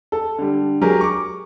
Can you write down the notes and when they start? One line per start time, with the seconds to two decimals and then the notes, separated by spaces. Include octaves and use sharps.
0.12 A4
0.38 D3 G3
0.81 F#3 G4 G#4 A#4
1.01 C#6 D6